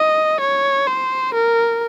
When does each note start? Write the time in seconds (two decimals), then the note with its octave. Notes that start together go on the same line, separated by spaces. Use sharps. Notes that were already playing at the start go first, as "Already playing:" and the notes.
Already playing: D#5
0.40 C#5
0.87 C5
1.34 A#4